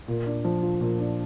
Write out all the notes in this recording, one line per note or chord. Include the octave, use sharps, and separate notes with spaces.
A#2
D4
F3
F4
A#2
D4